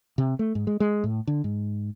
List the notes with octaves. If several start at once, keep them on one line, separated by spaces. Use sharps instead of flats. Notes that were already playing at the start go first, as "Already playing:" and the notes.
C3
A3
G#2
G#3
G#3
A2
D3
G#2